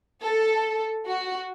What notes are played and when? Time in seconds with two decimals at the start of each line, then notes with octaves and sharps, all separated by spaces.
0.23 A4
1.06 F#4